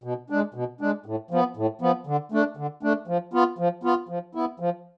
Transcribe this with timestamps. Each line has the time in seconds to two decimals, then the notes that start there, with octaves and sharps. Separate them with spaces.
0.04 B2
0.30 G#3 D4
0.54 B2
0.81 G#3 D4
1.06 A2
1.31 F3 B3
1.57 A2
1.81 F3 B3
2.07 D3
2.32 A3 D4
2.57 D3
2.83 A3 D4
3.08 F3
3.33 B3 F4
3.58 F3
3.83 B3 F4
4.09 F3
4.35 B3 E4
4.60 F3